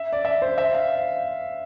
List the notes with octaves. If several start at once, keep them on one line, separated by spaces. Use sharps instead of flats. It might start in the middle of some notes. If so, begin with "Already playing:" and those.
Already playing: E5
D5
E5
C5
E5
F5